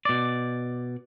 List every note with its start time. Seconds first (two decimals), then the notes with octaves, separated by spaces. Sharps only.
0.05 B2 D5